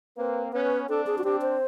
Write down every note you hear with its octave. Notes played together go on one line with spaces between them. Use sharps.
A#3 C4 B4
B3 C#4 B4
C4 D4 A4
G#4
F#4
C4 D4 G4
C5